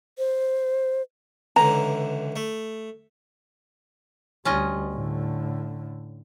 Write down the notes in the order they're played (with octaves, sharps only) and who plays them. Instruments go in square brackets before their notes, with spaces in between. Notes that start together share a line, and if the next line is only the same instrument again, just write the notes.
[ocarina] C5
[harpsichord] C#2 D3 E3 [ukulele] A#5
[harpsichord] A3
[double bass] D2 G3 [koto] C#4 F4 D#5
[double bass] A2 D3